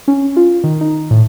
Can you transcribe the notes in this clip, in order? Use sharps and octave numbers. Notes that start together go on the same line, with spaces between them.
C#4
F4
D#3
D#4
A2